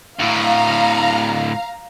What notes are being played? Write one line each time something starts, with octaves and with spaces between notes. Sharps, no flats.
D2 A2 F5 A#5